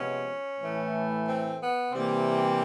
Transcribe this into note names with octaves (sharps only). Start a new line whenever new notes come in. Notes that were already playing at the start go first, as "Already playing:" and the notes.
Already playing: C3 F3 G#3 B3 C#4
A2 E3 A3
C4
B3
C3 E3 G3 A#3 C4